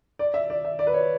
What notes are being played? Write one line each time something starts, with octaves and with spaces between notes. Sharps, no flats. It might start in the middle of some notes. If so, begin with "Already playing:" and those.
D5
E5
D5
E5
D5
B4
C#5